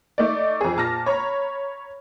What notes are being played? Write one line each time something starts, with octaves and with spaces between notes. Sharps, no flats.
A3 D#4 D5
F2 G#4
A#2 A5 F6 A#6
C#5 A#5 B5